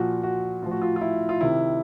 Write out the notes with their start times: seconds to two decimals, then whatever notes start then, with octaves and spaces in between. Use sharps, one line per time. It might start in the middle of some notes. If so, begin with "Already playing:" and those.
Already playing: A#2 F3 F#4
0.23 F#4
0.62 A2 F3 F4
0.71 F#4
0.82 F4
0.96 F4
1.01 E4
1.29 F4
1.41 C3 D#3 E4